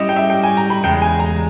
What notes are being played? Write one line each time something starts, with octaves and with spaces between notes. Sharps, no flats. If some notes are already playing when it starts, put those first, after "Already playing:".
Already playing: G3 C#4 E4 G4 D#5
G5
E5
G5
G#5
A#5
B5
E2 C#3 G#3 G5
G#5
A#5